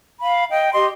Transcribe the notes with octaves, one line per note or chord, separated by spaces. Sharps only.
F5 B5
D#5 G5
G4 D#5 C6